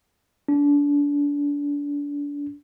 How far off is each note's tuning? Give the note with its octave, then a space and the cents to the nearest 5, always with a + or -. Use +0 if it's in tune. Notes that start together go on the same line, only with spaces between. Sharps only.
D4 -30